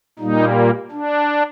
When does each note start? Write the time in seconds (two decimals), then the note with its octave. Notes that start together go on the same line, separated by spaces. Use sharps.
0.19 A#2 G3 A#3 D#4
0.91 D4